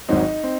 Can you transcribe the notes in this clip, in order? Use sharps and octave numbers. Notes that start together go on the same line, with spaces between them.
G#1 G#2 D#3 F#3 C4 D#4
C4